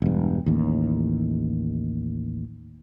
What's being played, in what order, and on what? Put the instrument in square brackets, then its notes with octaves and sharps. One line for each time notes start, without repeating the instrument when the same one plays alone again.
[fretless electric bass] E1 G2
A1 D#2